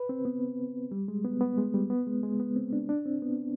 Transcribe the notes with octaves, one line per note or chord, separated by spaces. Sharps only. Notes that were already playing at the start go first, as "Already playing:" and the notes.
Already playing: B4
C4
B3
G3
G#3
B3
B3
G#3
G3
B3
G#3
G#3
B3
C4
D4
D4
C4
B3